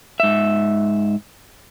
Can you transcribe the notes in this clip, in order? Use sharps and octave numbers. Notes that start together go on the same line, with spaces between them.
G#2 E5